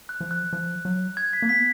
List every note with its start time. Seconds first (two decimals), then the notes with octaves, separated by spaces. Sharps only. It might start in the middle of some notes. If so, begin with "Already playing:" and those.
0.09 F#6
0.21 F3
0.31 F#6
0.53 F3
0.85 F#3
1.17 G#6
1.33 B6
1.42 A#3
1.49 B3 B6